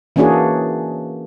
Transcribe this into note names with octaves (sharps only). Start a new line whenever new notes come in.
E3 A#3 C#4 D4 F#4 G#4